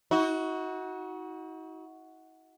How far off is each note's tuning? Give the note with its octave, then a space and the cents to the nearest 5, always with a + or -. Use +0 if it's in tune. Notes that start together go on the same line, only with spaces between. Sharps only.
D#4 +45 F#4 +0